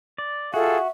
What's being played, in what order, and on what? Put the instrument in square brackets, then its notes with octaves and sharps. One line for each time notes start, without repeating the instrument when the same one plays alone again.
[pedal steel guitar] D5
[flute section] F4 A4 F5 [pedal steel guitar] F#4 [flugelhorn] G#4 [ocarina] E5